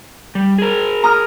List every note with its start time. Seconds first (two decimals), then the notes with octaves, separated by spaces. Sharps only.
0.35 G3
0.58 G#4 A#4
1.04 A#5 D#6 F6